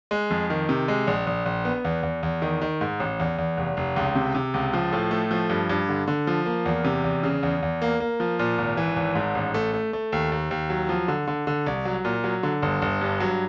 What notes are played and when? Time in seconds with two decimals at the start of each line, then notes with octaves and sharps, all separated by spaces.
0.11 G#3
0.30 F2
0.50 D#3
0.69 C3
0.88 G#3
1.07 A#1
1.27 A#1
1.46 A#1
1.65 B3
1.84 E2
2.03 E2
2.23 E2
2.42 D#3
2.61 D#3
2.81 G#2
3.00 A1
3.19 E2
3.38 E2
3.57 F1
3.77 F1
3.96 C#2
4.15 C3
4.35 C3
4.54 C#2
4.73 F3
4.92 A2
5.11 A3
5.31 F3
5.50 G2
5.69 G2
5.89 D3
6.08 D3
6.27 F3
6.46 A#3
6.65 E2
6.85 C3
7.04 E2
7.23 C#3
7.43 E2
7.62 E2
7.82 A#3
8.00 A#3
8.20 F3
8.39 A#2
8.58 G#1
8.77 E3
8.96 G#1
9.15 G#2
9.35 A1
9.54 A3
9.73 A3
9.93 A3
10.12 D#2
10.32 D#2
10.51 D#2
10.70 F#3
10.89 F3
11.08 D3
11.28 D3
11.47 D3
11.66 C2
11.85 F#3
12.05 A#2
12.24 F#3
12.43 D3
12.62 G1
12.82 G1
13.01 G2
13.20 F#3